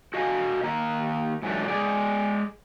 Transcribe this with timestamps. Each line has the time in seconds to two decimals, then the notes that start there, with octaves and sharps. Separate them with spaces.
0.14 F#4 D#5 F5 G#5
0.64 D#3 A#3 A#5
1.42 G#2 E3 F#3 A3 D4
1.68 G#3 G#4 D5